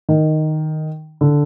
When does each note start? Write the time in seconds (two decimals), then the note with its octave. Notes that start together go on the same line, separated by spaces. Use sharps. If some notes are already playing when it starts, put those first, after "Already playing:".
0.09 D#3
1.21 D3